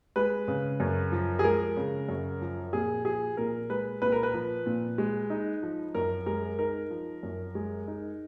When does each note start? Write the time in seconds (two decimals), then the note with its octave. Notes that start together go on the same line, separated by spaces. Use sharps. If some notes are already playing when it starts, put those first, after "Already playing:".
0.16 G#3 B4
0.48 C#3
0.80 F#2
1.12 F3
1.39 G#4
1.44 G#3 A#4
1.77 C#3
2.09 F#2
2.41 F3
2.73 A#2 G#4
3.05 F3 G#4
3.37 A#2 A#4
3.70 G#3 B4
4.02 A#2 B4
4.12 A#4
4.23 B4
4.34 F3
4.66 A#2
4.98 G#3
5.30 D#4
5.63 F3
5.95 F#2 A#4
6.26 G#3 A#4
6.59 D#4 A#4
6.90 F3
7.23 F#2
7.55 G#3
7.88 D#4